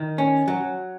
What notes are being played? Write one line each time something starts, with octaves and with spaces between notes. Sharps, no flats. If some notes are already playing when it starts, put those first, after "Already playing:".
Already playing: D#3
C#4
F#3